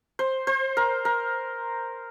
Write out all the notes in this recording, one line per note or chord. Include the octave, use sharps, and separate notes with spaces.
C5
C5
A#4
A#4